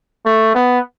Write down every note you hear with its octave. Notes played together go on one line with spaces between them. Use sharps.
A3
B3